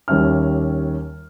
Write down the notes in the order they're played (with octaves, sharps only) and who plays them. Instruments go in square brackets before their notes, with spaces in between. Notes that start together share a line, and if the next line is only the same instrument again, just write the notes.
[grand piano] D#2 G3 C#4 E5 F6